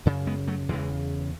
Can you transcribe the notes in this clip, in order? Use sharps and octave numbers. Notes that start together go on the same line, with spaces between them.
F#2 C#3
G#3 B3
F#3 A3
E2 C#3 E3 G#3